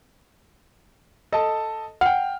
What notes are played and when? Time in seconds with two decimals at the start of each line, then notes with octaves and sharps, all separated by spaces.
1.32 A4 D#5 A5
2.01 F#5 G5 F6